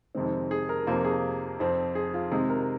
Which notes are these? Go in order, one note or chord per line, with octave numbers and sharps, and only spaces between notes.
F2 C3 D#3 G#3 C4
G#4
A#4
F2 C3 F3 A#3 F4
G#4
F2 F3 C4
G#4
F4
C3 D#3 G#3 G#4
A#4